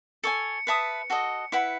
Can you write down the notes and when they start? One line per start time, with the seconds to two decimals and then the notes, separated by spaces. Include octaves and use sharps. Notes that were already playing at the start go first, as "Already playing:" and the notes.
0.24 A4 C#5 G#5 C#7
0.67 B4 E5 A5 D#6
1.10 F#4 A4 D#5
1.52 E4 B4 F#5 B5